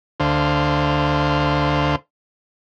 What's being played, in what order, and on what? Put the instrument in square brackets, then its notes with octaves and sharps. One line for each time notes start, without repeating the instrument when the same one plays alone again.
[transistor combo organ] D2 D3 C5 F5